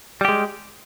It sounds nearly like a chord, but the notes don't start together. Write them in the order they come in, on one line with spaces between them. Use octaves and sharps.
G3 G4 G#3